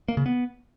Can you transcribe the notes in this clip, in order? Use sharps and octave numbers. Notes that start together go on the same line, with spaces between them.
A#3
C#3
B3